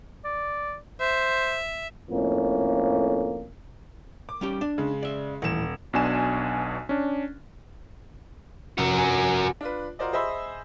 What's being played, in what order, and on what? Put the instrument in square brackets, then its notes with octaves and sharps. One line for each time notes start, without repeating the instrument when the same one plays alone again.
[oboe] D5
[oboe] C5 [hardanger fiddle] E5
[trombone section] F2 A2 A#3 C#4
[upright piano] D6
[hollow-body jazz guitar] G3 C#4 G4
D4
[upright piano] C#3 G#3
[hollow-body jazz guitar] D5 E5
[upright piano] D#1 E7 [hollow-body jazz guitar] A2 E3
[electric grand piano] B1 B2 D4 G#5 E7
C#4 D4
[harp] F1 [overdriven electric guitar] F#4 A#4
[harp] G#5 A#5
[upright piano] D4 F4 B4
F4 F#4 A#4 C5 D5 D#5
G#4 C5 D#5 E5 B5 E6